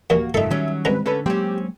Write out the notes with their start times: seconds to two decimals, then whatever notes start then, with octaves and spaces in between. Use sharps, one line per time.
0.10 D#2 A#2 E3 A#3 F#4
0.34 F#1 F2 G#2 D#3 D#4 A4 E5
0.50 D#3 F#3 G3 C#4
0.85 C2 G#2 B4 A#5
1.06 D3 C#4 A4 B4
1.26 F#3 G#3 A#3 C4 C#4 G4